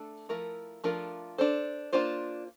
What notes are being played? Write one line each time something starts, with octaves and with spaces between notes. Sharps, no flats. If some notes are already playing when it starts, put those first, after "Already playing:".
Already playing: A3 D4 A4
F3 A3 E4 A#4
F3 A3 D4 F4 A#4
D4 A4 C5
A#3 D4 F4 C5